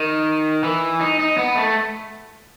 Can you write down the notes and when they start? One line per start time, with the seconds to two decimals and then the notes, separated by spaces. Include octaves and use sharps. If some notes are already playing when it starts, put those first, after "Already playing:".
Already playing: D#3
0.64 E3
1.01 D#4
1.19 D#4
1.38 B3
1.56 A3